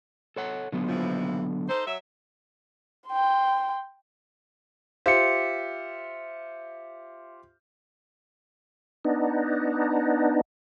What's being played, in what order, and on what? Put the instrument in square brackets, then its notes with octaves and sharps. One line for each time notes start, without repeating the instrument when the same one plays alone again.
[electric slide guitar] A4 C#5 F#5
D3 F#3 B3
[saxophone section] D#2 E3 F3
D#4 A4 C5
F#3 E5
[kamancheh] G5 C6
[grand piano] F4 G4 C5 [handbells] E5 C#7
[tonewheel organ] B3 D4 D#4